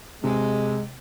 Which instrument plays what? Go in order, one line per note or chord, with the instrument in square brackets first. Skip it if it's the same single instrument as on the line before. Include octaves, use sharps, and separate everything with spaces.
[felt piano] C3 [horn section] G#3